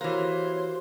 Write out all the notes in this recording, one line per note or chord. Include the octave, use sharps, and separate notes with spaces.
E3 A#3 F#4 G4 C5 C#5